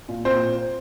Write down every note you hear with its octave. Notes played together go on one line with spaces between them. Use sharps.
A#2
A#2 C4 C5